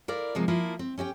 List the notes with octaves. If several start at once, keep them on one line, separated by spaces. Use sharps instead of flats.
E4 A#4 D5 F5
C3 F3 G#3 A#3
F3 A#3 E4 F4
C4
C#4 G4 D#5 G5